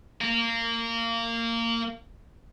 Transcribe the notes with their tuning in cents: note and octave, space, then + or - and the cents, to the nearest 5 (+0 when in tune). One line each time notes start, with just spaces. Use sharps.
A#3 -20